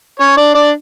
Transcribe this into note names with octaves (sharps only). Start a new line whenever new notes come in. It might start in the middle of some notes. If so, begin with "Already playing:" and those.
C#4 C#5
D4 D5
D4 D5